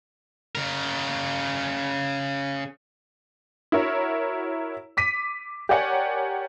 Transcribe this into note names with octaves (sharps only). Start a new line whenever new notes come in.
C#3 A#4
E4 F#4 A#4 C#5
D6 B6 D#7
G4 A#4 C#5 D5 F#5 G#5